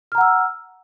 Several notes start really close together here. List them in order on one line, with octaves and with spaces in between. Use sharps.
F6 A#5 F#5 E6